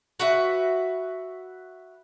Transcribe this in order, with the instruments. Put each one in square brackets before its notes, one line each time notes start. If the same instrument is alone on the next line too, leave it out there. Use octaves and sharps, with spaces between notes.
[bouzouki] F#4 B4 E5